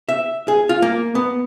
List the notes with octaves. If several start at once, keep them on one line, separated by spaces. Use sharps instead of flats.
E5
G#4
F4
A#3
B3